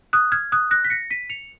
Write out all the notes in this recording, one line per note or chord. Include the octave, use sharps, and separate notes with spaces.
D#6 F#6
F6 G#6
D#6 F#6
F#6 A#6
B6
A#6 C#7
B6 D#7
C#7 F7